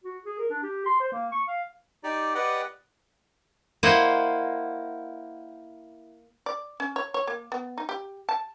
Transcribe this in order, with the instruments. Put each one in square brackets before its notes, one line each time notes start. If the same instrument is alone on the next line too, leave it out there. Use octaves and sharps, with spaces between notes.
[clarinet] F#4
G#4
A#4
D4
G4
C6
C5
A#3
C#6
F5
[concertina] D#4 G4 D5
G4 B4 D5 D#5 F#5
[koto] A#3 E4 C5 D#5 F#5
[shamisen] D5
C#4
C#5
C#5
A#3
B3
D#4
G4
A5